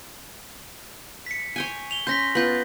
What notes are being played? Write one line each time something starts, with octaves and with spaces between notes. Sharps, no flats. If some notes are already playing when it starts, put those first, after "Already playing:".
B6 C#7
C#5 G5 G#5
F7 G7
C#4 C6 G6 A#6 B6
B3 F4 G6 F#7